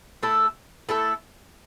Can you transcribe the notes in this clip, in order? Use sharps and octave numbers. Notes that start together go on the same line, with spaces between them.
A3 E4 A4
A3 E4 A4